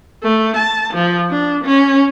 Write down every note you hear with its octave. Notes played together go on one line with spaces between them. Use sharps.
A3
A5
F3
D4
C#4